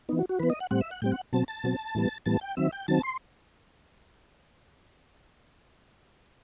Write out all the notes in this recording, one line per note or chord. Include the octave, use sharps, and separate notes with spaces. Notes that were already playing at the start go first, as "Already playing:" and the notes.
E3 B3 D#4
F#4
F#4
E3 B3 B4
D#5
F#5
A2 G3 C4 F#5
E5
F#5
A2 G3 C4 G5
F#5
B2 F#3 C4 A5
A5
B2 F#3 C4
A2 E3 G3 B3
A2 E3 G3 B3 A5
G5
D#3 F#3 C4 E5
G5
D#3 F#3 C4 A5
C6